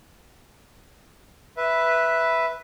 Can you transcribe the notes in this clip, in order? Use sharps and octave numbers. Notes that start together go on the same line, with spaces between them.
B4 E5